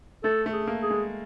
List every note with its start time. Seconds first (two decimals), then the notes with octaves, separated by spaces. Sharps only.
0.24 A3 A4
0.46 A3
0.53 G#4
0.67 A#3
0.82 G#4
0.90 G#3